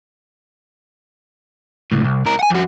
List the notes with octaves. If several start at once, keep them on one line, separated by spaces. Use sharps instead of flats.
C#2 A2
C2
C#2 A#4
F#5 G#5
F2 F#4